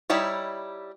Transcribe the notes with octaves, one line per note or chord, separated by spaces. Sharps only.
G3 D#4 E4 G4 C#5